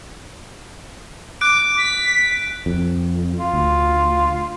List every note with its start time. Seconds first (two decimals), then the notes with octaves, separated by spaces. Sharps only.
1.41 D6 F#6 D7
1.77 B6
2.66 F2
3.40 F4
3.53 D2